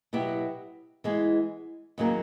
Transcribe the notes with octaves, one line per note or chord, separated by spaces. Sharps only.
B2 F#3 B3 E4 G4
E3 G#3 B3
D#2 C#3 F#3 A#3